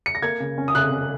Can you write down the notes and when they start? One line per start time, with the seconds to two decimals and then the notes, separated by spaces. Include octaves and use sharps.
0.06 C#7
0.15 A#6
0.22 A#3 G#6
0.40 C#3
0.58 C#4
0.68 D#6
0.75 C#3 F#6
0.92 C#4